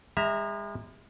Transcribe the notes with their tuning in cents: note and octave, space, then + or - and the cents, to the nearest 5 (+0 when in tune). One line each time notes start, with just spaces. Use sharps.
G#3 -40 E5 -10 A#5 +0